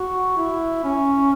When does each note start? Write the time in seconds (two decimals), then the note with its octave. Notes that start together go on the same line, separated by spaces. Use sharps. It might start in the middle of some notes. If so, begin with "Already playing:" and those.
Already playing: F#4
0.37 E4
0.84 C#4